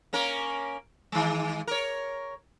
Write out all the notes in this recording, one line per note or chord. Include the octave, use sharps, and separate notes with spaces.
A#3 C#4 A#4
D#3 G#3
A#4 C#5